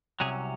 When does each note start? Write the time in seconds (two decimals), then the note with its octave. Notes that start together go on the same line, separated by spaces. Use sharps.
0.20 C2 C3 F#3 C#4 G#4